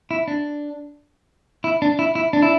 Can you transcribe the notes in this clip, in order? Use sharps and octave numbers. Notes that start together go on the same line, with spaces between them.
E4
D4
E4
D4
E4
E4
D4
E4